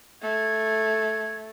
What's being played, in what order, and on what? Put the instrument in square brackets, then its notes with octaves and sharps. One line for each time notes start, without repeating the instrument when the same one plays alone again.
[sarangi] A3 [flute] G#6